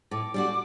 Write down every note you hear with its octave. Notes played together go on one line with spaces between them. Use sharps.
A2 D6
G3 D4 F#4